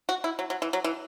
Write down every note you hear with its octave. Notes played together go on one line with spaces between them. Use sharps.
F#4
E4
F#3
F#3
E3
F#3
E3